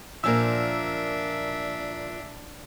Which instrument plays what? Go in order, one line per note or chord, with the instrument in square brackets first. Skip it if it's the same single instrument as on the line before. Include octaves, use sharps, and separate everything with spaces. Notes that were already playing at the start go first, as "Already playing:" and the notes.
[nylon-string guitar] A#2 F3 [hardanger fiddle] D4 [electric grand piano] A#4 G#5 E6 [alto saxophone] E5